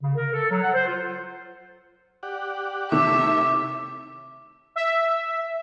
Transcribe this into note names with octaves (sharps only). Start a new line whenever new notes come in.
C#3
A#4
A4
F#3
F#5
C5
F4
G4 D5 F#5
C3 D#3 A3 E4 C#5 E5 D6
E5